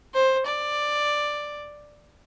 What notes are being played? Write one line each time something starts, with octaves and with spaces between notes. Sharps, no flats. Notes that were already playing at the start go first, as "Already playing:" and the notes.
C5
D5